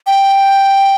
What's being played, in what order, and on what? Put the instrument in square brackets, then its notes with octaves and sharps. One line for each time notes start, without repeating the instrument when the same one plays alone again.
[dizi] G5